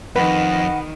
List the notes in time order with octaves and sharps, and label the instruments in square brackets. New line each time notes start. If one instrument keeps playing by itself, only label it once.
[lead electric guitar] F2 [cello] D#3 [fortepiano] B4 [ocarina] F#5